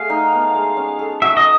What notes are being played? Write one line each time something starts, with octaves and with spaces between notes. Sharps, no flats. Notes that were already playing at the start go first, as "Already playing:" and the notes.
Already playing: A3 F#4 G#4 F5
D#4
B3
G#3
C#4
A4
F#4 E5
D#5